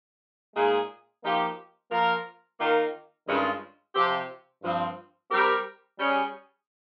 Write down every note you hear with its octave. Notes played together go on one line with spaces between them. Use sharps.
A#2 G#3 D#4 G#4
F3 A#3 D#4 G4
F3 A#3 F4 A#4
D#3 A#3 F4 A#4
G2 D#3 G#3 C#4 F4
C3 F3 C4 G4
G2 F3 C4
G3 C4 G4 A#4
G3 C#4 G#4